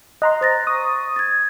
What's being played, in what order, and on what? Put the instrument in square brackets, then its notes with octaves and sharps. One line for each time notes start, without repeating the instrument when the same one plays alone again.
[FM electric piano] D#5 A#5 C6 [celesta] F#6
[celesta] C5 A6 A#6
[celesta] C#6 [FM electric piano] D#6
[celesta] G#6 A6